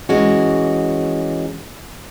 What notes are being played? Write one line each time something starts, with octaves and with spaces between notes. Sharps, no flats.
E3 G#3 C#4 F#4